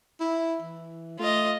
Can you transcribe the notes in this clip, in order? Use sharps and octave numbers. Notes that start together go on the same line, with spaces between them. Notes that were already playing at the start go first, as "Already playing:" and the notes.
E4
E3
A3 F4 D#5